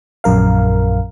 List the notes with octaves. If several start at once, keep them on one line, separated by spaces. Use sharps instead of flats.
A#1 F#2 A#4 F5